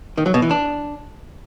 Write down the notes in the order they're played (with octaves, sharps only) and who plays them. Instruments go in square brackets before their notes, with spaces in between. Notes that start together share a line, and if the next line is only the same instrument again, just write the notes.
[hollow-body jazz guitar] D#3
F#3
B2
E3
D4